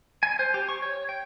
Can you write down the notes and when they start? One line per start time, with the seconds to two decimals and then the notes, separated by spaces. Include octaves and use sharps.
0.23 G#5
0.39 C5
0.54 G4
0.69 C#6
0.82 C#5
1.09 G5